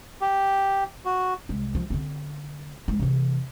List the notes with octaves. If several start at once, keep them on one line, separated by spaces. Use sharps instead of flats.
G4
F#4
C2 G#3
D#3 F3
D3 C4
E3 G#3
C3 E3